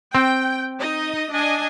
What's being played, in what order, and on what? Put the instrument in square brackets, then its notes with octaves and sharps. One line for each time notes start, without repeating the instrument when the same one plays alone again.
[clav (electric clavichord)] C4 [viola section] G5
[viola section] D#4 D#5
D4 D#5 G#5